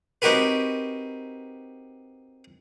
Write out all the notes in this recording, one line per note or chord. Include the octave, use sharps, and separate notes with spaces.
C4 D#4 F#4 G4 A#4 B4